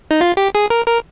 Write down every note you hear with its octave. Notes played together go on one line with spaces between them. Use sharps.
D#4
F4
G4
G#4
A#4
A#4